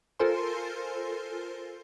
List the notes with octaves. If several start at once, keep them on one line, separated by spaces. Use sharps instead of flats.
F4 A4 A#4 C5 G#5 C6